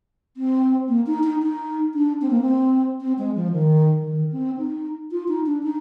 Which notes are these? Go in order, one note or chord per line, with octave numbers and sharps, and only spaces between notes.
C4
A#3
D#4
D#4
D#4
D4
C4
A#3
C4
C4
G#3
F3
D#3
F3
D#3
C4
D#4
F4
D#4
D4
D#4